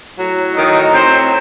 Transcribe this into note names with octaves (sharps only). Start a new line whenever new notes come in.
A2 F#3
D#3 D#4
C4 C5